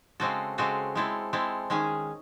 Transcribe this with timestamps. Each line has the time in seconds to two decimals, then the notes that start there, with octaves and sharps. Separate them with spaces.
0.20 C#3 G#3 C4 F#4 A4
0.58 C#3 G#3 C4 F#4 A4
0.95 G#3 C4 E4 A4
1.33 G#3 C4 E4 A4
1.70 D#3 G#3 C#4 G#4